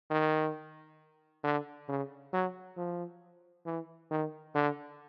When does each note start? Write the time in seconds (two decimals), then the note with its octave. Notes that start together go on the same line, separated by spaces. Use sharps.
0.10 D#3
1.44 D3
1.88 C#3
2.33 F#3
2.77 F3
3.66 E3
4.11 D#3
4.55 D3